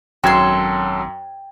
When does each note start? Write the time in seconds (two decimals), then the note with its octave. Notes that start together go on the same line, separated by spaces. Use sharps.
0.24 G#1 F#2 F#3 A4 G5 C6 G#6